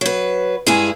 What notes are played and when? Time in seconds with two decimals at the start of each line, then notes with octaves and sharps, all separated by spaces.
0.01 F#3 B4
0.67 G2 G#3 E4 G#4 G#5